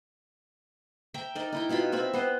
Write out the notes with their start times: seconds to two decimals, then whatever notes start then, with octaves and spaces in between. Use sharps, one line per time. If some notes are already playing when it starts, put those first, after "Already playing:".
1.14 E5 G5 A#5
1.35 D#4 A#4 D5 D#5
1.52 D#4 E4 G5
1.69 B2 D#4 F4 B5
1.92 C4 E5 B5
2.14 B3 C5 D#5